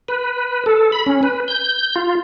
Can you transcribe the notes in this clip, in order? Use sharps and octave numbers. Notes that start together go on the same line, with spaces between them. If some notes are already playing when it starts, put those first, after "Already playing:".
B4
A4
B5
C#4
B4
G6
F4